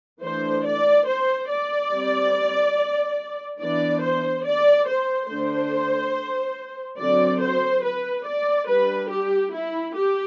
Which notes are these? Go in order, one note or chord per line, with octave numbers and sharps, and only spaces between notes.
E3 A3 D4 C5
D5
C5
D5
G3 C4
E3 B3 D4 D5
C5
D5
C5
D3 A3 D4 C5
D3 F#3 C4 D5
C5
B4
D5
G3 D4 B4
G4
E4
G4